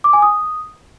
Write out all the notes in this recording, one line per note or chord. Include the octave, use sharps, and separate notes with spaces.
D6
G#5
D#6